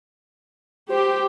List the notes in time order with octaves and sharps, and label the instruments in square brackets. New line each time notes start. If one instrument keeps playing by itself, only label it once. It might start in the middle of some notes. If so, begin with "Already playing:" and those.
[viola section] G4 [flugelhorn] C5